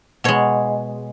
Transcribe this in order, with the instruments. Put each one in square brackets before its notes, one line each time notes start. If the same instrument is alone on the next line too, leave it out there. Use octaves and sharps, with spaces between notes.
[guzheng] B2 G#3 C#5